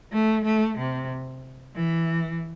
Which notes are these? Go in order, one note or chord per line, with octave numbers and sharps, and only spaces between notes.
A3
A3
C3
E3